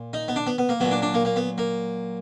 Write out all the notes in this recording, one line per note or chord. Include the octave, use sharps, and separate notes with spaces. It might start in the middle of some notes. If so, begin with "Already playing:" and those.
Already playing: A#2
D#4
B3
D4
B3
B3
A#3
A#2 F#3 B3
D4
D4
A#3
A#3
B3
A#3